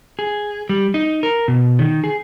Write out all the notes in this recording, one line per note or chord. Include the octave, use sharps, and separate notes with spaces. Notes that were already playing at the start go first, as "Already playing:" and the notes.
G#4
G3
D#4
A#4
B2
D#3
G#4